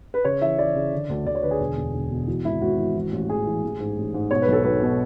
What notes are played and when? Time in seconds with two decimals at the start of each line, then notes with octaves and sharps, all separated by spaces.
0.14 B4
0.25 C#3 C#5
0.41 E3 E5
0.58 E3 D5
0.75 C#3
0.92 D3
1.09 D2
1.26 D2 D5
1.35 C#5
1.43 D3 B4
1.51 G#4
1.60 E1
1.77 E1
1.94 E1
2.11 B2
2.27 E3 F#4
2.45 G#1 E4
2.61 G#1 F#4
2.78 E3
2.95 E3
3.12 A1
3.29 A1 G#4
3.47 E3
3.63 A1
3.80 G#2
3.97 A1
4.14 G#2
4.31 B2 C#5
4.42 B4
4.48 B1 A4
4.63 B1 B4
4.82 B2